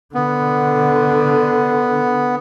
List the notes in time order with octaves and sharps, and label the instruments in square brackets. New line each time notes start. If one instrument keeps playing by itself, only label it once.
[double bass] D3 [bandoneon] B3